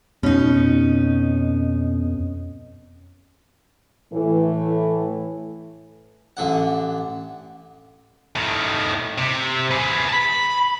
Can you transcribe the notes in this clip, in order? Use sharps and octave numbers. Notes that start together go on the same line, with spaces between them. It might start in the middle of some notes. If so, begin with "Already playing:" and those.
F2 B2 C#4 D#4
A2 E3 A3
A1 D3 F#5
A2 D#3
C3
G#4 B4
A5 B5